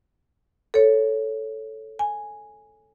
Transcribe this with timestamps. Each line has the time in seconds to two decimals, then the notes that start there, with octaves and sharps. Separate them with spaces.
0.74 A4 C#5
1.99 G#5